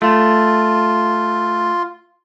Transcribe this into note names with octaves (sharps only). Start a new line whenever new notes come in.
A3 F4